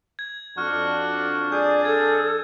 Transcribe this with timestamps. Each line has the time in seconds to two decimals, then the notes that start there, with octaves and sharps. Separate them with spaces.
0.19 G#6
0.58 F2 D4 F#4 F6
1.52 G#4 D5 G6
1.85 A4 G#6